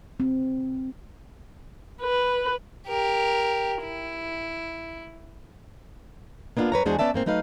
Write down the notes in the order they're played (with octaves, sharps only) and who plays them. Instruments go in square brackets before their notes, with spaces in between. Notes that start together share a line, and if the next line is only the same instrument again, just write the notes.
[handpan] C4
[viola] B4
[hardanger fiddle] G4 A#4
E4
[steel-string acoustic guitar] A#3 B3 D4 D#4 F4
F#2 B4 C#5 A#5
E2 G#3 D4 F#4 G#4 C5
B3 C#4 D5 E5 A5
G#2 A#3 C4
F#3 A3 D#4 B4 F5